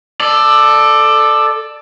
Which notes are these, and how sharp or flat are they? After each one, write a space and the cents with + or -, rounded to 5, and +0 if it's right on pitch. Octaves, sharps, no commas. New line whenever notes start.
A4 +0 D5 +20